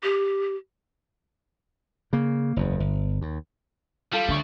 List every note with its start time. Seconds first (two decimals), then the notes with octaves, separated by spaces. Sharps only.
0.03 G4
2.13 C#3 A#3
2.56 F#1 E2
2.80 G1
3.21 D#2
4.13 G3 F4 A4
4.28 D2 D3 C#6